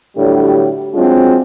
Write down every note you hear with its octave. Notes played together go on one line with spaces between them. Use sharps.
A2 D3 F#3 G3 D4 G4
F#3 G#3 C4 D4 F4